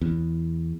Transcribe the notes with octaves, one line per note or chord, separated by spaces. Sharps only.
E2